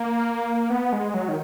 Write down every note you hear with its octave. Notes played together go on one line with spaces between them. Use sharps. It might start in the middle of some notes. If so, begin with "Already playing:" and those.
Already playing: A#3
B3
G#3
F#3
D#3